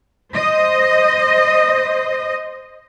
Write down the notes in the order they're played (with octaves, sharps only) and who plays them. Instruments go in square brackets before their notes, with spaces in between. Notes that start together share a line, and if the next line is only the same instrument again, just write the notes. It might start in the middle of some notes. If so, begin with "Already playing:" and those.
[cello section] C5 D#5